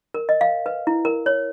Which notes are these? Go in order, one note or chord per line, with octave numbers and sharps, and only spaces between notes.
A#4
D#5
F5
B4
E4
A#4
C#5